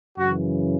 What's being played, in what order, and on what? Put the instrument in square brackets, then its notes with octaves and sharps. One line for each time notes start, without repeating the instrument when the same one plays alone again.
[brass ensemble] F#2 C#3 E3 F#4